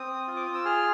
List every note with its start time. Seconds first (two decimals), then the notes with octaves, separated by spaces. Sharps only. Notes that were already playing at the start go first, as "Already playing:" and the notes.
Already playing: C4 D#6
0.28 F4
0.36 D6
0.46 D#6
0.55 E6
0.65 G#4 F6